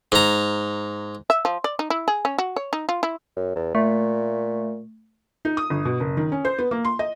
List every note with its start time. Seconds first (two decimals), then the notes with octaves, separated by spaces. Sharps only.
0.12 G#2 A#5
1.30 E5
1.45 F3
1.64 D5
1.79 D#4
1.90 E4
2.08 G#4
2.25 C#4
2.38 F#4
2.56 C#5
2.73 D#4
2.89 F4
3.03 E4
3.36 F#2
3.55 E2
3.75 A#2 A3
5.45 D#4
5.57 D#6
5.70 G1
5.85 B2
6.00 F#1
6.17 D#3
6.32 C#4
6.45 C5
6.58 B3
6.71 A#3
6.84 C6
6.99 D#5